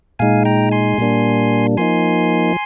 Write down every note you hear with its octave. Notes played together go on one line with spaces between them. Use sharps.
A#2 G#3 D#4 F5 G#5
G5 A#5
G#5 C6
A#2 G3 A#3 D4
F3 A#3 D#4 G#5 C6